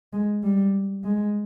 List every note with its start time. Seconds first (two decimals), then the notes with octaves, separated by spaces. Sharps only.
0.13 G#3
0.43 G3
1.03 G#3